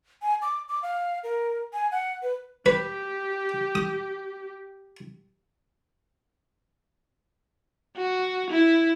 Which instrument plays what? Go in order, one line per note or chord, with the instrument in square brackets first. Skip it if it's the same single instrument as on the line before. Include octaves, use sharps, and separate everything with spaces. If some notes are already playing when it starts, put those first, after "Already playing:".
[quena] G#5
D6
D6
F5
A#4
G#5
F#5
B4
[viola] G4 [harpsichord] B4
[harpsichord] D#6
[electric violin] F#4
E4